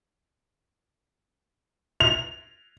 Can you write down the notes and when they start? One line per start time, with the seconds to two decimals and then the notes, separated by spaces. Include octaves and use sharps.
2.00 F7